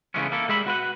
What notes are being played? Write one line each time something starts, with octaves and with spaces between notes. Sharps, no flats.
C#3 E3 G#3 A3 B3 C#4
A#3 E4 A4
G3 G#3 E5 B5
F#4 B4 F#5